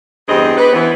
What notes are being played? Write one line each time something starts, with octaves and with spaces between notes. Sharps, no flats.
E2 G2 G3 C4 G#4 D#5
B3 B4 C5
E3 B3